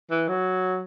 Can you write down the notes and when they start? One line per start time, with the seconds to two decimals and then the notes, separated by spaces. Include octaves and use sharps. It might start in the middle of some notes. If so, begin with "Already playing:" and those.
0.11 E3
0.28 F#3